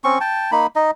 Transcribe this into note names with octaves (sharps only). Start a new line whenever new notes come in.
C4 C#4 C#6
G5 A5
A#3 D#4 B5
D#4 D#5